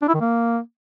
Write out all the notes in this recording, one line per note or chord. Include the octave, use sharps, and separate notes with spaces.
D4
E4
D#3
A#3